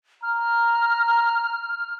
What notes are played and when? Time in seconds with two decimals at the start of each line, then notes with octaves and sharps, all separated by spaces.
0.23 A#5 F6